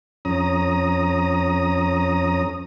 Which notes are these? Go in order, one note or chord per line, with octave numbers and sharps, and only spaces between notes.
F2 C#4 A#5 D#6